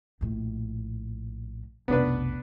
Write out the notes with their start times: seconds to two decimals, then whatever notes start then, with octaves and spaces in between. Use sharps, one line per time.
0.21 A#1 A2
1.88 F1 B1 B3 D4 B4